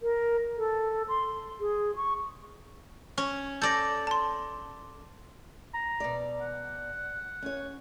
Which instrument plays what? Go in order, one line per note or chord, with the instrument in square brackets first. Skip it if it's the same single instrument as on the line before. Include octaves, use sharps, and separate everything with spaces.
[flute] A#4
A4
C6
G#4
C#6
[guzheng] C#4
[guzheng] A4 D5 [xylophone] G6 A#6
[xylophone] A5 C6
[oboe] A#5
[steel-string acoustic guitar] B2 D5
[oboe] F#5
[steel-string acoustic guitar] C#4 C#5